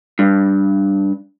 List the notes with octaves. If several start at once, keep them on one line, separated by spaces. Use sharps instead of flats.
G2